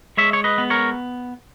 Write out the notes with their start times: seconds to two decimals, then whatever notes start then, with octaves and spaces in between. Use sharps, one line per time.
0.17 G#3 C#5 E5
0.33 C#5
0.44 B4 D#5
0.58 B3
0.70 A#4 C#5